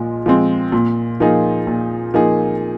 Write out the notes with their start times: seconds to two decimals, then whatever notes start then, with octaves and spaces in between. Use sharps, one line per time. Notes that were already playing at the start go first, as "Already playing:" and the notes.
Already playing: A#2 F3 G#3
0.26 F3 G#3 C4
0.72 A#2
1.20 F3 A#3 D#4 G#4
1.67 A#2
2.14 F3 A#3 D#4 G#4